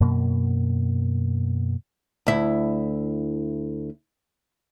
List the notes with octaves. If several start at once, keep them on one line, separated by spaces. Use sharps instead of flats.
F#2 B2 A#3
D2 E4